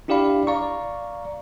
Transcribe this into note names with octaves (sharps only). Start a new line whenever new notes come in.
D4 E4 G4 D5 F5 B5
D5 F5 A#5 C#6